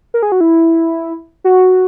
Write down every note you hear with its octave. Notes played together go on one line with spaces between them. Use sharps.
A#4
G#4
F#4
E4
F#4